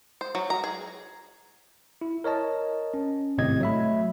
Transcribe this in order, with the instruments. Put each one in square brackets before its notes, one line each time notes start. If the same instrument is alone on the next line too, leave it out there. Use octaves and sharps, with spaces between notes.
[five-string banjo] C5
F#3
A#5
G#4
[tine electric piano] E4
A#4 C#5 D#5 A5
C#4
G#1 A2 C3 C4 D#5 G#6
F#3 A3 E5 B5